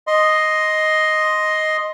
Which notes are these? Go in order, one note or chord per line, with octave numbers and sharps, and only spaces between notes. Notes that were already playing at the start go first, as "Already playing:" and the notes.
D#5 C6